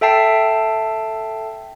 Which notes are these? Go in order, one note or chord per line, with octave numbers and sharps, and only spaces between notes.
A4 E5 G5 A5 C7